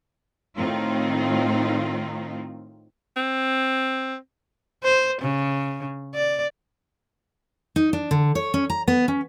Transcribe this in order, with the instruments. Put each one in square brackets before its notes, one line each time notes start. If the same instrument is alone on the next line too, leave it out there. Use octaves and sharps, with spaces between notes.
[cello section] A2 D#3 C4 D#4 F4
[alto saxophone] C4
[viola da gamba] C5
C#3
D5
[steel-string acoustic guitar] D#4
D4
D3
C#5
C#4
A#5
B3
C#4